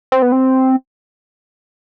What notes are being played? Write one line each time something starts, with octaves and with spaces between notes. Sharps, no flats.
C4
B3
C4